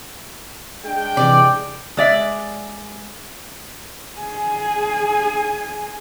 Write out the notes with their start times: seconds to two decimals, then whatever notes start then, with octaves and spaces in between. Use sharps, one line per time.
0.85 G#3 D4 G5
1.17 C3 E3 D5
1.97 G#3 D5 E5
4.19 G#4 G#5